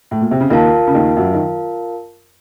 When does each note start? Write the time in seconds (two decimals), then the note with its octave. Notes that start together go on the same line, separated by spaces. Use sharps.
0.11 A2
0.21 A#2
0.31 C3
0.41 C#3
0.50 D#2 D#3 F4 A#4 F5 A5
0.87 C#3
0.95 D#2 D#3
1.17 F#2 F#3
1.34 D#3